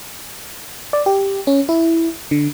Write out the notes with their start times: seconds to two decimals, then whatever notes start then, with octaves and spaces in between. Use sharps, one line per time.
0.93 D5
1.06 G4
1.47 C#4
1.69 E4
2.31 D3